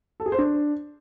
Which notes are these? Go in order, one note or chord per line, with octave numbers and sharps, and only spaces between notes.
A4
G#4
C5
D4